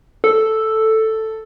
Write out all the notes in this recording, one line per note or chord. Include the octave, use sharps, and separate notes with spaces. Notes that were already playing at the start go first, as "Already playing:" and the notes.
A4